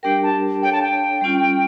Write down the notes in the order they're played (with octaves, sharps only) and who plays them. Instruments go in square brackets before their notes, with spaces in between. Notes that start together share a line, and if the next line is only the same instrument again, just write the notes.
[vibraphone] G3 D4 G4 A#4 [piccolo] G5
[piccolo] A5
[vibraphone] D4 A4 C#5 F5 [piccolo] G5
[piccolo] A5
G5
[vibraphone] G3 C#4 F4